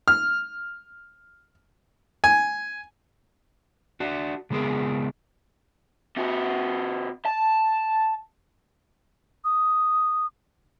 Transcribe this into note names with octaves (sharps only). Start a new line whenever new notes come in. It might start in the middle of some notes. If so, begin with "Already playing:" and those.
F6
G#5
D4 F#4
C#3 G#3 B3 G#4 A#4
C3 F#4
A5
D#6